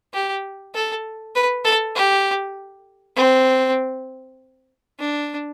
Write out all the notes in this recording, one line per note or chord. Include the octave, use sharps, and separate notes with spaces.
G4
A4
B4
A4
G4
C4
D4